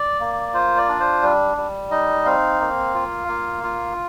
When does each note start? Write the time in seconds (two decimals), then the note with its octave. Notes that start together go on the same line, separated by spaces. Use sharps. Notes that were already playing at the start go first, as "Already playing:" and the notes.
Already playing: D5
0.20 A#3
0.54 F4 C5
0.77 D5
0.89 D4
1.00 C5
1.23 G3
1.57 G3
1.91 D#4 D#5
2.25 C4 F5
2.60 A#3
2.94 F4
3.28 A#3
3.63 F4